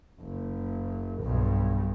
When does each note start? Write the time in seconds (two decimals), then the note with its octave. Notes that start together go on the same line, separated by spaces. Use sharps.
0.21 F#1
1.22 B1 G2